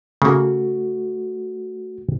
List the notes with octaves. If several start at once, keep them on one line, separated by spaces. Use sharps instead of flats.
C#3 A3 A#3 F#4